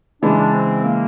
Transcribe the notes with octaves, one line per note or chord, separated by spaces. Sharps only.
C#3 E3 G#3 D4
D4
C4
A#3